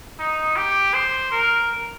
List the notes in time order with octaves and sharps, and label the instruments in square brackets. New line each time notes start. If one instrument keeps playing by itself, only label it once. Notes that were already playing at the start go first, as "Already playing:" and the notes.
[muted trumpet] D#4
G4
C5
A#4